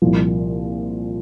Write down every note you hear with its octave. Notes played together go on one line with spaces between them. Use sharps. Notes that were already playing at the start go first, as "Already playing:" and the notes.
C2 A#2 F3